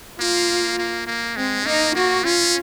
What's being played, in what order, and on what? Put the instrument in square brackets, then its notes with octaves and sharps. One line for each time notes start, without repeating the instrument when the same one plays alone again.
[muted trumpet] A#3 [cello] F4
[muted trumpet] A#3
A#3
[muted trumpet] G#3 [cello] C4
[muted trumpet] A#3 [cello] D#4
[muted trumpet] A#3 [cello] F#4
[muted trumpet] C#4 [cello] F4